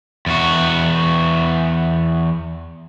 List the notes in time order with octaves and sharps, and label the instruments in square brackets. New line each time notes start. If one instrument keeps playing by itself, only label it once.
[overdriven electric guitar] E2 F#4